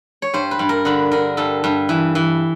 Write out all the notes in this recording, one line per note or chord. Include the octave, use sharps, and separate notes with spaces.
C#5
G2 C5
B4
G2
A#4
D3 B4
D3 A#4
G2 A4
G2
E3
E3